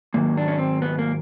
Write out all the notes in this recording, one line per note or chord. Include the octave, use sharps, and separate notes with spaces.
G#2 D#3 F#3 A#3
D4
C#4
C4
B3
A#3